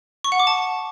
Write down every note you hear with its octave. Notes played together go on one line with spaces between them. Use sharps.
C#6
F#5
D6
A5